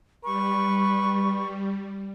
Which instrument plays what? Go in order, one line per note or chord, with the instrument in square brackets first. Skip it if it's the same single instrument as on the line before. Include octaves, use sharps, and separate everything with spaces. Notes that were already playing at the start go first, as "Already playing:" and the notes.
[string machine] G3 [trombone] B4 [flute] C#6